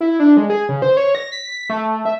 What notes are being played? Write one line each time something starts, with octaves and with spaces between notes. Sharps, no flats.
E4
D4
G#3
G#4
C#3
C5
C#5
A#6
B6
A3
A3
E5